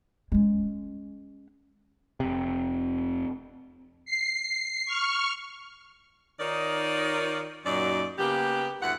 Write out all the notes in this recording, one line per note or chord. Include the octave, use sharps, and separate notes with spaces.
G#3 C#4
F1 C3
C7
C#6 F6
D#3 D#4 F4 A#4 C#5 D5
F#2 A#2 F#3 D#4 D5
C#3 A#3 B3 G4
D2 G2 E4 F#5